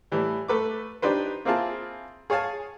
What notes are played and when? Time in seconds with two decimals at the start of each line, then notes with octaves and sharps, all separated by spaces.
0.12 A2 E3 G3
0.48 A3 A4 B4 D6
1.02 D4 D#4 G4 B4 C5
1.45 A#3 C4 E4 F4 G#4 A5
2.30 G#4 C#5 F5 G#5 A5